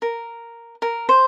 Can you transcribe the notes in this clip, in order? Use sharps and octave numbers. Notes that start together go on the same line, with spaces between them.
A#4
A#4
C5